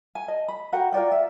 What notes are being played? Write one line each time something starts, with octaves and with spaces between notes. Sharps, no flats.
G#5
D#5 A5
B5
F#4 A#4 F#5 G5
F4 A#4 D5 G5
E5